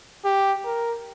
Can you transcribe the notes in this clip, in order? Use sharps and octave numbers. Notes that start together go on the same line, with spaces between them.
G4
A#4